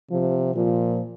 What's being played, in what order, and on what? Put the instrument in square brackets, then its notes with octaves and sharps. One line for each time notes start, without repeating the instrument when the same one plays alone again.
[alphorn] C3 [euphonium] F3
[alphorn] A#2 [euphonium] F3